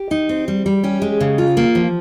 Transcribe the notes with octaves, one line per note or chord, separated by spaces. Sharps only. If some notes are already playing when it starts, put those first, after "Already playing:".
Already playing: G4
D#4
C4
G3
G3
C#4 G4
G#3
C#3
F4
A#3
F3